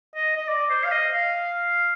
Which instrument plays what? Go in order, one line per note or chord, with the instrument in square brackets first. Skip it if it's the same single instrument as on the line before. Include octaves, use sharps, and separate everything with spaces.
[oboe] D#5
D#5
D5
C5
F5
D#5
F5